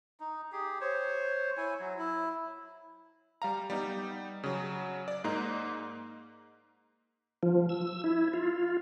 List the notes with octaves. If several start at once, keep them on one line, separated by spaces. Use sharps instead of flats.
D#4
G4 G#4
C5 C#5
E4 C#5 G#5
F#3
E4
G3 F5 A#5
G3 B3 D#4
C#3 F#3
D5
G#2 A#3 D#4
F3
E6
E4
F4